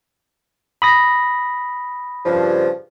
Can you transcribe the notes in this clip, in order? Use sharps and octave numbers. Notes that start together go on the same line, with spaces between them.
B5 D#6 A#6
G2 C#3 F3